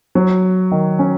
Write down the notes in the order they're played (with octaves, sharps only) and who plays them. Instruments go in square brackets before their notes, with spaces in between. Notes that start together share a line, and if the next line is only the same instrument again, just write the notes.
[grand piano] F#3
D#3
C#4